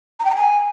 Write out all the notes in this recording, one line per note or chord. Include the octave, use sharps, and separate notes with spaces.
A#5
G5
A#5
G#5